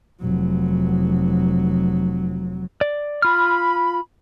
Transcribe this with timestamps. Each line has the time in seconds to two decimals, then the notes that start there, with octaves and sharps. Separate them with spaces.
0.21 F1 F#3
2.81 D5
3.22 F4 B5 F6